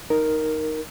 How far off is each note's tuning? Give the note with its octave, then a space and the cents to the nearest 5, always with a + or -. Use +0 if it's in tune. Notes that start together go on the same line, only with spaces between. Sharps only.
D#4 +0 A#4 +0